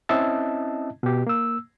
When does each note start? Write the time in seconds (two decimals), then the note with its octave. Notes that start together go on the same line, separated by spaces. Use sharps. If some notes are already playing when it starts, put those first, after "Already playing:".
0.09 C4 C#4 E4 D#5 E5 A5
1.03 B2 G4
1.27 A#3 E6